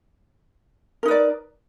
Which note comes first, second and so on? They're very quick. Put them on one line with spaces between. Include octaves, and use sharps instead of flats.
A#4 D#4 B4 D5